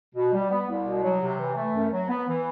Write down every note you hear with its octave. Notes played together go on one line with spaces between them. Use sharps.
B2
G3
B3
C2
B2
F#3
C3
E3
A3
F#2
F#3
B3
E3